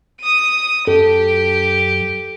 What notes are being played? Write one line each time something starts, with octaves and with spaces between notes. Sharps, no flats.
D#6 D#7
F#2 G4 A4